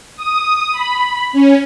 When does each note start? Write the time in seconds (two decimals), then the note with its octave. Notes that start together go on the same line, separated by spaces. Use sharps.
0.16 D#6
0.72 B5
1.33 C#4